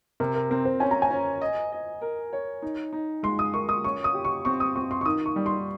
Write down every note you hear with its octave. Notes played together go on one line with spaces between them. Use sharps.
C3 A#4
A#4
C4 A#4
C5
C#4 G#5
A#5
G#5
C#4
D#5
D#5
A#4
C#5
D#4
D#4
G#3 C6
D#6
A#4 C#6
D#6
C#4 C#6
D#6
G4
C#6
C4 C#6
D#6
C4 C#6
C6
C#6
D#3 D#6
C#6
G3
C6